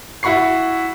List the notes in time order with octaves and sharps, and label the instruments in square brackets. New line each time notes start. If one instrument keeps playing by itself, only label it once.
[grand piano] E4 F#4 B5 C#6 C7